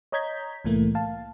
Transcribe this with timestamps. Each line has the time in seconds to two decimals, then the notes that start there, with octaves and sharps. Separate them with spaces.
0.12 C#5 D#5 A#5 G6 G#6 B6
0.65 C2 A2 E3 A3 A#3
0.95 F5 A5